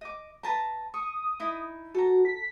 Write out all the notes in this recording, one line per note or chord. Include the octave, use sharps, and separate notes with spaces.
D#5 D6
B4 A5 A#5
C#6 D#6
D#4 E4
F#4 A4 A#5
B6